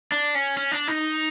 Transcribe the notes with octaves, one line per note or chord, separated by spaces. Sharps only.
D4
C#4
C#4
D4
D#4